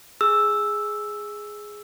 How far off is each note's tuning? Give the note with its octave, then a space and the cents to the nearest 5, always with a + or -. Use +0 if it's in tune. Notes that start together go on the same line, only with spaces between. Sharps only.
G#4 +0 E6 +0